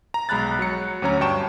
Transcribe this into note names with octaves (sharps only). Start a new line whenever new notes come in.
A#5
B1 G#3 A#5 B5 F#6 A6
F#3 C#7
D2 F#3 C#4 C#5 A#5
G2 G5 A5 C#6 E7